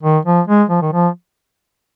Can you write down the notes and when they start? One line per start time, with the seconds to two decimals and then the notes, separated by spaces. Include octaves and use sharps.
0.03 D#3
0.25 F3
0.48 G#3
0.70 F3
0.82 D#3
0.92 F3